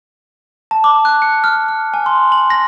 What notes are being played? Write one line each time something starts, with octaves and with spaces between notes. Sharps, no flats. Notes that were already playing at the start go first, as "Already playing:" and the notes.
A5
D6
F#6
C#7
F6
F6
G#5
C6
F#7
A#6